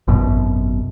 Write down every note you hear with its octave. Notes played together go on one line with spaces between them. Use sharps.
G#1 F#2 B2